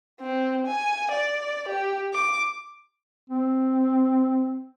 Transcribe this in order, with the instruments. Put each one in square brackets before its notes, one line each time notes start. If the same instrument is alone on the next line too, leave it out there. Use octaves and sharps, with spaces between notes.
[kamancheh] C4
G#5
D5
G4
D6
[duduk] C4